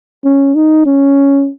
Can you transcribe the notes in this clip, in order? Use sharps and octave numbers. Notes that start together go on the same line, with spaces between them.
C#4
D#4
C#4